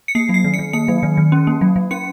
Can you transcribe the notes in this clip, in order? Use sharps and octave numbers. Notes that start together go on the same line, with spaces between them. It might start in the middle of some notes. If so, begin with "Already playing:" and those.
C#7
A#3 C7
F#3 C7
D#3
C#7
D#3
A#3 C#7
F#3
D#3
D#3
C#4
A#3
F#3
F#3
C#4 C#7